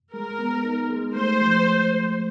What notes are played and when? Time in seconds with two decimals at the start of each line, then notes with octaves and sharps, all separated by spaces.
0.13 G#3 A#4
0.39 B3
0.64 D#4
0.90 G#3
1.15 A3 C5
1.41 F3